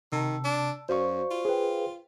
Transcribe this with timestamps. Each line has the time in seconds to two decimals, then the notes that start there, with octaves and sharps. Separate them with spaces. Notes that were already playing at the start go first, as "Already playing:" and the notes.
0.12 C3 D#3 A5 E6
0.44 D4
0.89 F#2 F#4 C5 D5 F5 C#6
1.31 F4
1.45 G#4 B4 C5 F5 G5